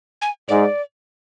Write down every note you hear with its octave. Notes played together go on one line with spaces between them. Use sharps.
G#5
G#2 D5